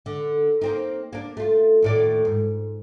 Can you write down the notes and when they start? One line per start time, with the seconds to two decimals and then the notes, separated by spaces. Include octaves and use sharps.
0.06 D3
0.62 A#3 C4 D#4
1.13 A#3 D4
1.37 A3 F4
1.82 D#2 A2 D5
2.25 G#2